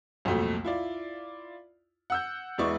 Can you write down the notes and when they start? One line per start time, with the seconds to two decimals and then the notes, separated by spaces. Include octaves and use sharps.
0.25 C2 F2 A#2 F#3 A3
0.64 E4 F4 D5
2.10 F#5 E6 G6
2.58 E1 G#3 B3 E4 D5 C#6